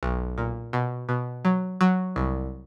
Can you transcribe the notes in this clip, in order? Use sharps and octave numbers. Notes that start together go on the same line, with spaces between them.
B1
A#2
B2
B2
F#3
F#3
C2